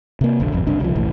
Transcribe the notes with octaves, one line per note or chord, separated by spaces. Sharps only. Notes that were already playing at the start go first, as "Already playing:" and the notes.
C3 A#3
F1 A#1 D3
D#1 G#1 F2
F#1 C2 D4
C2 C#3 F3
F1 B1 A2 E3